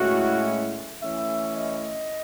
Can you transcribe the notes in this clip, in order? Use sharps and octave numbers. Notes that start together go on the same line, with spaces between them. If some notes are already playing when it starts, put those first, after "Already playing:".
Already playing: A2 G#3 C#4 E4 F#4
E3 A3 C#4 E4 E5
D#5